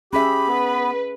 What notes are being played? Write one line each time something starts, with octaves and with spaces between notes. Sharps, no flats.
C#4 G4 G#4 E5 B5
B3 B4